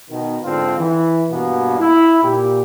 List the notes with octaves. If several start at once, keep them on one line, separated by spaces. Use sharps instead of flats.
B2 D#3
G#2 D3 C4 F4
E3
G2 B2 A#3 B3
E4
A#2 G4